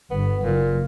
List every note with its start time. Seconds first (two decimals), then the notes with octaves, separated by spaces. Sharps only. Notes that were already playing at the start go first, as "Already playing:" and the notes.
0.11 G1 B3
0.43 F#1 A#2